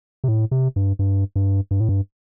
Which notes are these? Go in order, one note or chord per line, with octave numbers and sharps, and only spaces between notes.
C3
A2
C3
G2
G2
G2
G2
A2
G2